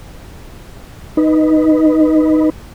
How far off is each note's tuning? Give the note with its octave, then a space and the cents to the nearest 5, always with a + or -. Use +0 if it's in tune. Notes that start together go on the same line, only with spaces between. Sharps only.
D#4 +0 B4 +0